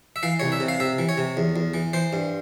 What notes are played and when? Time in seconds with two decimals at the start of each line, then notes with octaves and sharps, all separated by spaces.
0.16 E5
0.23 E3 F5
0.40 C2 C#5
0.52 E5
0.60 C3
0.68 F5
0.80 C3 E5
0.99 E3
1.09 C#5
1.18 C3
1.37 E2
1.56 E2
1.74 E3
1.93 E3 C5
2.13 G2